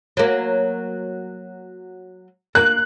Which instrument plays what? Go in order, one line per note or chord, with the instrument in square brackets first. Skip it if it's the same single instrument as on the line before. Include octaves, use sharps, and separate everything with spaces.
[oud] F#3 A#3
[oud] A#3 [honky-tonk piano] F#6